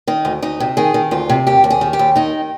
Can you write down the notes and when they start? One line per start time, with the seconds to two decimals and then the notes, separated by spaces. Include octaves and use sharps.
0.07 D#3 D#4
0.25 D2
0.42 D2 D#4
0.60 C3
0.77 D#3 G#4
0.94 D#3
1.11 D2 F4
1.29 C3
1.47 D#2 G4
1.64 D#2
1.70 G#4
1.81 D#3
1.93 G4
1.99 D#2
2.16 D#3 D#4